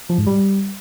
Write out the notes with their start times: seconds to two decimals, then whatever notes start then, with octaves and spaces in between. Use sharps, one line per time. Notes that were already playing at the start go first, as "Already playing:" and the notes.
0.09 F3
0.18 G#2
0.27 G3